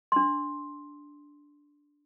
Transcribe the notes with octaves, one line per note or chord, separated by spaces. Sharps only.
D4 C6